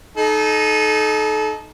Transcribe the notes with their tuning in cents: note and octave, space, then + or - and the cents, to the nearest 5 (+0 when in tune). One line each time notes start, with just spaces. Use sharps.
D#4 -5 A4 -35